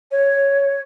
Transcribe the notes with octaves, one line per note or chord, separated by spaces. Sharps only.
C#5